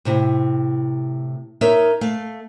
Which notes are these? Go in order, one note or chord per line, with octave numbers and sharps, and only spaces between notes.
A2 C3 E4
D#4 A#4 C#5 E5
A3 F5